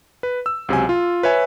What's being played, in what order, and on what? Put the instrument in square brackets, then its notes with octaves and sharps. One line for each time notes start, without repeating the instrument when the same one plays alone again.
[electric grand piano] B4
E6
C#2 C3 F#3 G#5
F4
B4 C#5 E5 G#5